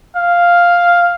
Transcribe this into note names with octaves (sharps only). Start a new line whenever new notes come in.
F5